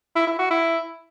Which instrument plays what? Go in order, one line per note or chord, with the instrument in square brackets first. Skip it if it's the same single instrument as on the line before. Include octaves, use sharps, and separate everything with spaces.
[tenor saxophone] E4
E4
F#4
E4